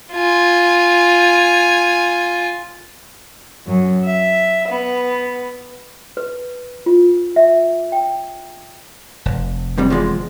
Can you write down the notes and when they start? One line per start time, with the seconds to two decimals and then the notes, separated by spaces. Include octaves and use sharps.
0.13 F4 G#5
3.67 F#2
4.05 E5
4.67 B3
6.17 B4
6.86 F4
7.36 E5
7.92 G5
9.26 F1
9.78 F2 C3 G3
9.90 E2 F3 G#3